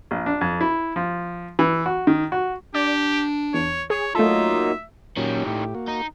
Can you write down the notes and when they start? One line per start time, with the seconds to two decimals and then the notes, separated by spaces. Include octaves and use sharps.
0.11 A#1
0.26 D4
0.41 F2
0.61 E4
0.96 F3
1.59 E3
1.86 F#4
2.07 D#3
2.32 F#4
2.74 D4 G4 D5
3.54 E2 C#5
3.90 G#4 C#5
4.15 F#3 A3 A#3 D#4 F4 A4 E5
5.17 A#2 D#3 F#3 G3 C#4
5.47 A2 G4
5.75 A#3 F#4
5.88 D#4